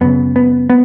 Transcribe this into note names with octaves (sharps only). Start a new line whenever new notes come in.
F#2 C#3 B3
B3
B3